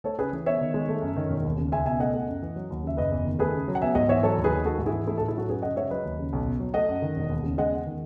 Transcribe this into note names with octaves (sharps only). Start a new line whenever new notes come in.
A3 A4 C#5
C#3 G#4 B4
E3
B3 C#5 E5
D#3
G#3
A3
F#2
D#3
E1
D#2
C#3
C#2 E5 G#5
B2 E5 G#5
A3 D#5 F#5
A3
F#2
E3
F#3
D#2
C#3 E5
F#1 B4 D#5
E2
D#3
A3 G#4 B4
C#3
F#3
F#5
B3 E5 G#5
G#2 D#5 F#5
E3 C#5 E5
F#3 A4 C#5
D#2
G#4 B4
D#3
G#3 F#4 A4
G#2
E4 G#4
E3
A3 E4 G#4
F#4 A4
A2
E4 G#4
F#3 F#4 A4
F#2 G#4 B4
C#3 D#5 F#5
G#3 C#5 E5
F#3 B4 D#5
D#2
C#3
B1
B2
F#3
A3 D#5 F#5
F#2
D#3
E1
D#2
C#3
G#3 D#5 F#5
E2
D#3